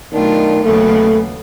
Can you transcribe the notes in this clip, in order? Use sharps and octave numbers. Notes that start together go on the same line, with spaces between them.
B2 D#3 F#3 A3 D4 F4
D#2 C#3 F#3 A3 B3